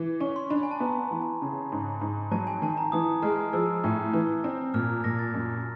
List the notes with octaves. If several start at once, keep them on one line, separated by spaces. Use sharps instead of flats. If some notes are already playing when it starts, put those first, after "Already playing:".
Already playing: E3
C#4 C#6
C6
D4 B5
G#5
A5
B3 A#5
E3
C#3
G#2
G#2
F#3 A5
G#5
D#3 A5
A#5
E3 D#6
G#3 F6
F3 E6
A2
E3
C4
A#2 F6
A#2 A#6
A6
F#2